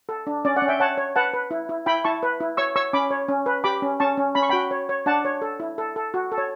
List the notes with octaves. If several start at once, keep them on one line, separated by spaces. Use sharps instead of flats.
A4
D4
C#4 D5
D5 F#5
C#4
E5 G5
C#5 F#5 A5
C#5
B4 F#5 A5
B4
E4
E4
E4 G5 B5
E4 A5 C#6
B4
E4
C#5 C#6 E6
C#5 C#6 E6
C#4 B5 D6
C#5
C#4
B4
G4 B5 D6
C#4
C#4 A5 C#6
C#4
C#4 B5
C#6
F#4 G5 B5
C#5
C#5
D4 F#5 A5
C#5
A4
E4
A4
A4
F#4
A4
C#5